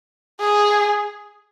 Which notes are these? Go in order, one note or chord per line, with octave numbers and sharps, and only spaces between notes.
G#4